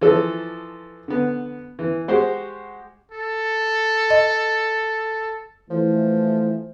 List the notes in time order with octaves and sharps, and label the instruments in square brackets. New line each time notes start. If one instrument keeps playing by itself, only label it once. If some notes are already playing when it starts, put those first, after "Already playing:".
[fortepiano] E3 F3 A4
D3 B3
E3
G#3 F#4 G4 C5
[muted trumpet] A4
[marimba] D#5
[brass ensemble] E3 A3 [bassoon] F3